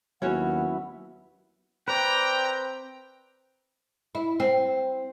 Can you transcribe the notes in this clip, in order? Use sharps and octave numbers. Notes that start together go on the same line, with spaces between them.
D#2 F#3 B3 C#4 E4 F#4 C#5 F#5
C4 B4 D5 G5 A#5
E4
C4